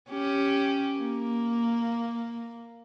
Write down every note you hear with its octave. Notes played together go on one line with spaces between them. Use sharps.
C#4 G4
A#3